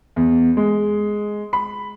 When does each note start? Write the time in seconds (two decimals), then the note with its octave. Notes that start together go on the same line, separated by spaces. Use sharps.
0.16 E2
0.57 G#3
1.53 B5